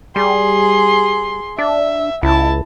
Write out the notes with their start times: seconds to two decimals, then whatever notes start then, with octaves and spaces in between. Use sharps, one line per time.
0.16 G3 G#4 C6
1.58 D4 E5
2.23 C#2 E4 A5